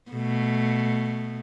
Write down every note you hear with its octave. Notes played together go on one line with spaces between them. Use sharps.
B2 A3